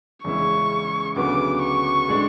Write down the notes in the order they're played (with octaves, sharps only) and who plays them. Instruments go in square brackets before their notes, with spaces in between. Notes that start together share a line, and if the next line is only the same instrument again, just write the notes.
[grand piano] E2 C#3 G#3 C#4 E4 [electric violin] C#6
[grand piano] D2 C#3 F#3 B3 [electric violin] D6
[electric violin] C#6
[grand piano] A2 G#3 D4